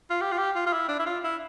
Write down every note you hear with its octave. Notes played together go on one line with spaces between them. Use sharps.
F4
G4
F4
G4
F4
F4
E4
D4
E4
F4
E4